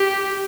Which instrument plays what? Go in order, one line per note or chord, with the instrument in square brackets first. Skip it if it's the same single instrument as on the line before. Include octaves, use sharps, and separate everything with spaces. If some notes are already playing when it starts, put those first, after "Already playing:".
Already playing: [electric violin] G4